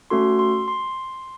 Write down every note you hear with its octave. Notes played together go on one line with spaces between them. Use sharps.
A3 C#4 F#4 A4 C6
C6
C6